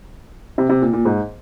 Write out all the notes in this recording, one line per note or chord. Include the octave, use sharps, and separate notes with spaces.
C3
C3
A#2
A#2
G#2